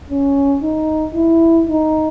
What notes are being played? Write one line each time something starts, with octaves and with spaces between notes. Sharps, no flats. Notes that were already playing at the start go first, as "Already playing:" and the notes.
C#4
D#4
E4
D#4